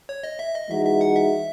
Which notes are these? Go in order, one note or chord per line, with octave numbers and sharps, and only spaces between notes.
C#5
D#5
E5
D#5
E3 G#3 D#4 F#4 E5
E5
F#5
E5